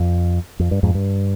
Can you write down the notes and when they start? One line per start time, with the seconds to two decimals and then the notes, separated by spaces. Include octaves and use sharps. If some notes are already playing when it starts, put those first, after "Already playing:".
Already playing: F2
0.59 F2
0.71 G2
0.83 F2 G#2
0.94 G2